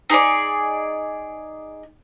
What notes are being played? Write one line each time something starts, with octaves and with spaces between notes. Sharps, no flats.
D#4 G#4 C#5 D5